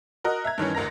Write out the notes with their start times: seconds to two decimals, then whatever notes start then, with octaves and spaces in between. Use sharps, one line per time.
0.24 F#4 A#4 D#5 F#6
0.44 E5 A#5 G#6
0.58 G2 D#3 E3 C#4
0.75 A1 D2 A#4 A#5 A#6